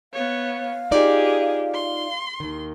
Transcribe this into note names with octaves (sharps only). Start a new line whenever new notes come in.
B3 C#5 F5
D#4 F4 G4 G#4 D5
C6
D#2 D#3